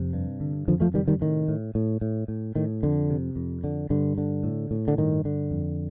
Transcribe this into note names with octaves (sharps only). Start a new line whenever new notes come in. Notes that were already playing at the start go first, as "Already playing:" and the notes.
Already playing: F2 C3
G2
D3
F2 D3 F3
F3 A3
C3 D#3 G3
D#3 G3
A2 D#3
A2
A2
A2
A2
A2 D#3
F2 D3
C3
F2
D3
G2 D3
D3
A2
A2
D3
G2 D#3
D3
F2